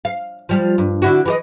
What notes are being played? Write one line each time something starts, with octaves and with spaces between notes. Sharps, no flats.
F5
F3 G3
G2
D3 E4 F#4
E3 G4 D#5